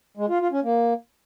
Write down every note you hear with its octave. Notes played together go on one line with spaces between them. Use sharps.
G#3
F4
F4
C#4
A#3